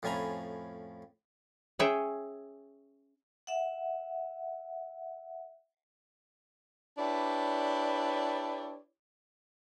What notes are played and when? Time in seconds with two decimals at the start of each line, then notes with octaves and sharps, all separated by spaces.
0.03 F2 A2 C#4 G#5 A#5 B5
1.79 C#4 G#4 C#5 E5 G5
3.47 E5 F#5
6.98 D4 E4 G4 B4 C#5 D5